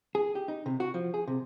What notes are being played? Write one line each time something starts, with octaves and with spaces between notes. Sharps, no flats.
G#4
G4
D#4
C3
F#4
F3
G#4
C3